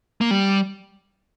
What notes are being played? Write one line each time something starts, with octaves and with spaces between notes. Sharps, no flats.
A#3
G3